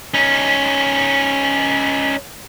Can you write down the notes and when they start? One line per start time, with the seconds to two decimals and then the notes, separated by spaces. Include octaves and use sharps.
0.14 C#4 D#4